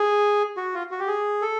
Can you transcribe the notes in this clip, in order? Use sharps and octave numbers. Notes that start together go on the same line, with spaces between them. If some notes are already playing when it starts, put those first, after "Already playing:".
Already playing: G#4
F#4
F4
F#4
G4
G#4
A4